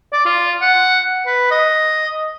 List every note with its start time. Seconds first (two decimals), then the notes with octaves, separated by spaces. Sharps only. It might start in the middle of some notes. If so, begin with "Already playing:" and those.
0.13 D5
0.25 F4
0.61 F#5
1.26 B4
1.51 D#5